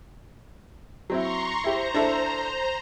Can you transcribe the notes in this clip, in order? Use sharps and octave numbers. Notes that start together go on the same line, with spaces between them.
F#3 C4 E4 A#5 C6 C#6
E4 G4 C5 A#5
D4 E4 A4